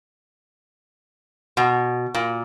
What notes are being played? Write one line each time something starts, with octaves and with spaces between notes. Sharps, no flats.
B2
A#2